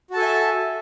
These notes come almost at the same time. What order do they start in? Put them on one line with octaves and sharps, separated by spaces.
F#4 A5 A4 G#5 E5